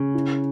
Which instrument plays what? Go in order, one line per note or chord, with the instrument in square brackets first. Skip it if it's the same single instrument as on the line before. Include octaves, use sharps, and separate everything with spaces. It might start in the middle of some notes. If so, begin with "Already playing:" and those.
Already playing: [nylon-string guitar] C#3 [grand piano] C#4
[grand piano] E4